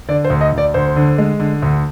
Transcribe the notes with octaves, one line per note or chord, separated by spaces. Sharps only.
D3 D5
C5
D2
D#5
D2
D5
D2 C5
D3
G#3
D3
D2